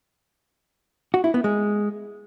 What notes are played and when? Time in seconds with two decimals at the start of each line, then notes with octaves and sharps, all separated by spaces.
1.14 F#4
1.24 E4
1.34 B3
1.44 G#3